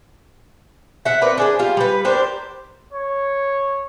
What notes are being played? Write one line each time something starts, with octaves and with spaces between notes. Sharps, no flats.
E5 F#5
C4 A#4 B4 D5
D4 G#4 C5
G3 F4 F5
G3 B4
D4 G4 A#4 C5
C#5